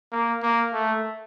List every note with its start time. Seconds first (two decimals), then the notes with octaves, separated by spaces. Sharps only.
0.12 A#3
0.42 A#3
0.73 A3